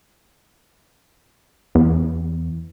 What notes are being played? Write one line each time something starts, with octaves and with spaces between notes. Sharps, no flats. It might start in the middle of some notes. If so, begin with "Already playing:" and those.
E2